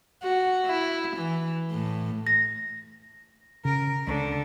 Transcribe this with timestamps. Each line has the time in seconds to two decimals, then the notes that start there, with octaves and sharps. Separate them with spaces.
0.22 F#4
0.67 E4
1.17 E3
1.71 A2
2.27 A#6
3.65 C#3 A#4
4.07 C#2 D3